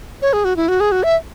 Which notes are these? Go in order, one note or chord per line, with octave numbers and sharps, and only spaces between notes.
C#5
G#4
F#4
E4
F#4
G#4
F#4
E5